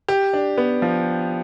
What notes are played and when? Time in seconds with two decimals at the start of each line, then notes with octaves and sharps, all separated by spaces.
0.08 G4
0.33 D4
0.58 B3
0.82 F3